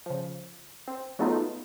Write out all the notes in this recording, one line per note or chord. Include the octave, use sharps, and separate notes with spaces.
C#3 F3
C4
F#3 G#3 A3 B3 D#4 F4